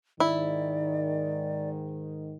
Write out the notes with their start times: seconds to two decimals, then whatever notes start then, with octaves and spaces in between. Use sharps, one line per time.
0.20 G#2 D#3 E4 D5